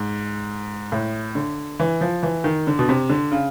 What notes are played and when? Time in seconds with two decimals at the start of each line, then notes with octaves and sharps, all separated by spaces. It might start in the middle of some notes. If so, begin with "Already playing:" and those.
Already playing: G#2
0.92 A2
1.35 D3
1.80 E3
2.01 F3
2.23 E3
2.44 D#3
2.67 D3
2.79 B2
2.89 C3
3.10 D3
3.32 C#3